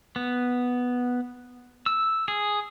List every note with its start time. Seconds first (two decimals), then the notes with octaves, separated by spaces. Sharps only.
0.16 B3
1.86 E6
2.28 G#4